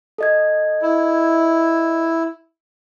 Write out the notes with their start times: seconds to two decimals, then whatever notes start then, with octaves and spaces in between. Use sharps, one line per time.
0.18 A4 D#5 G#6
0.82 E4